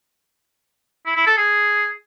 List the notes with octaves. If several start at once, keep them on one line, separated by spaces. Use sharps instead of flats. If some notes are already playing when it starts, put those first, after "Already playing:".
E4
E4
A4
G#4